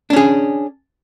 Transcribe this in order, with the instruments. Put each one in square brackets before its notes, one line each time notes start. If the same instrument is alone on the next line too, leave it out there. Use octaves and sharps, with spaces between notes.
[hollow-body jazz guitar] D4
C#4
G#4